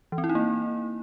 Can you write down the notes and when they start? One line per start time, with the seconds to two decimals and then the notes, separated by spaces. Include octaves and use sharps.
0.12 E3
0.18 C4
0.24 E4
0.29 D#4
0.35 A#3